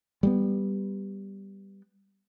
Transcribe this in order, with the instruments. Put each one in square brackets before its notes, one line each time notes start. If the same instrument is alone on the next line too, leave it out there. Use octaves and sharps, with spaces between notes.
[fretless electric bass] G3 G#3 B3